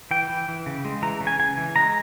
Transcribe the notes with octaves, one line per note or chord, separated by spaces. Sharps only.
E3 G5
E3
E3
C#3
G#3
E3 A#5
C#3
G#5
C#3 G#5
E3
G#3 A#5